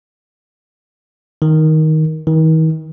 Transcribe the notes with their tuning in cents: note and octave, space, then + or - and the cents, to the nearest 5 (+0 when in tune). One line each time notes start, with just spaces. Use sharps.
D#3 +10
D#3 +40